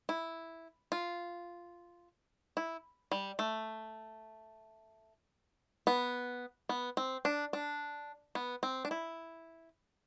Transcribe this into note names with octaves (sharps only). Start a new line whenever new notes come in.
E4
F4
E4
G3
A3
B3
B3
C4
D4
D4
B3
C4
D4
E4